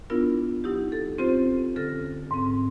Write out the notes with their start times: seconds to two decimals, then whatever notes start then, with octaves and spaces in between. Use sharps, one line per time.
0.10 B3 D4 E4 F4 A#4
0.64 F#3 D#4 E4 G4
0.92 A4
1.18 C4 C#4 F4 G4 C5
1.76 D3 C#4 A4 F6 A#6
2.31 G#2 C4